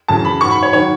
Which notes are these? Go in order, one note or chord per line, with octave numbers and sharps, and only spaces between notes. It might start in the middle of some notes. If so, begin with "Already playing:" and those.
F#2 C#3 E3 A5
B5
G#2 F#3 C#6
B5
C#5
D#3 F#3 C#5